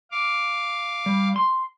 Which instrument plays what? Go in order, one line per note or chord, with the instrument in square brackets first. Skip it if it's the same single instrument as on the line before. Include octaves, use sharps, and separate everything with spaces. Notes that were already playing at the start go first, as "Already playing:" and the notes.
[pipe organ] F5 D6
[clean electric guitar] G3
C6